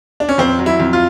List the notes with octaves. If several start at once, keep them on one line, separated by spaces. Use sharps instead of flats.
D4
C#4
F2 C4
F#3
E4
F2
F4